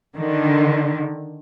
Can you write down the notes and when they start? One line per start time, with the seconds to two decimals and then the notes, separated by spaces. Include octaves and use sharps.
0.17 D3 D#3